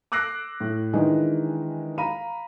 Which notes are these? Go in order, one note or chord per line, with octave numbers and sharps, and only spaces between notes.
D6 E6 F#6 A#6 C7 D7
A2
D#3 E3 G#3 D4
F5 A#5 B5 D#7